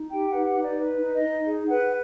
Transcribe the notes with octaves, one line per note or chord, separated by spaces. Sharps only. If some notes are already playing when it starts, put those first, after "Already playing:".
Already playing: D#4
G4 G5
F#5
B4
F#5
D#4
D5
B4
D#4
D#5
D#4
G#4
B4 F#5